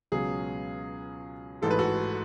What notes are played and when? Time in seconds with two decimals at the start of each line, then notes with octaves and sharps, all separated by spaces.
0.12 C#2 B2 F#3 C#4 G#4
1.62 A1 G#2 E3 G#3 A4
1.71 B4
1.79 F#4 A4